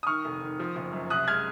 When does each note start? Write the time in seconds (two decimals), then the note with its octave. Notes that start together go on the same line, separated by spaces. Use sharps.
0.03 D#6
0.07 D#3 C#6 F6
0.25 F1
0.42 D#3
0.59 F3
0.76 F#1
0.93 F#2
1.10 C2 D#6 F#6
1.28 G#3 F6 G#6